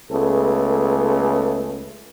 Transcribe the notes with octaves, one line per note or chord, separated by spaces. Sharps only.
C#2 A3 B3 G#4 A4